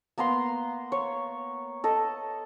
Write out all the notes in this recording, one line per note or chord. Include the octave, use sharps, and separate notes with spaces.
A#3 B3 A#5 C6
C#5
A4 D#5